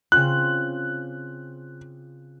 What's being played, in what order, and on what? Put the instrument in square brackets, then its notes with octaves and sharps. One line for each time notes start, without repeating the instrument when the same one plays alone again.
[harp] C#3 C4 F4 [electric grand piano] F#6